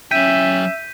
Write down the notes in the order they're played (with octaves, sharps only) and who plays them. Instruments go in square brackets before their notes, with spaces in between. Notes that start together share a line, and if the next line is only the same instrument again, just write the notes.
[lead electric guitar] F#3 G5 [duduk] C#4 [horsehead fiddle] E5 [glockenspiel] G6 B6 D#7